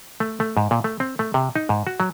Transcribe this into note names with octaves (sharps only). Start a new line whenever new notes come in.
A3
A3
G#2
A#2
A3
C4
A3
C3
D#4
G#2
F#4
F#3